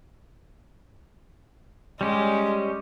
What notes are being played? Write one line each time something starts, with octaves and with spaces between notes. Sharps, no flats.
G3 G#3 C#4 G4